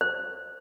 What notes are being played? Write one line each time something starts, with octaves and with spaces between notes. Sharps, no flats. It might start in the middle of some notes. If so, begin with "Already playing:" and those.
C5